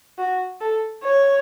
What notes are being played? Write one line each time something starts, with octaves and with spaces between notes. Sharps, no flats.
F#4
A4
C#5